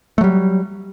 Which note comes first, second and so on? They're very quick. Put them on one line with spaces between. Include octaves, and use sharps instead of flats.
A3 F#3 G3